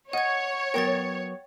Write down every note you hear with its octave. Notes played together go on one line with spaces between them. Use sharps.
C#5 D#5 F#5 G#6
F#3 B3 A#4 G5 C#6 A6